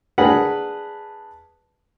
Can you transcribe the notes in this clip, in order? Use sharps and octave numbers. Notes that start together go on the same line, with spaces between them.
D4 G#4 A#4 B4 F#5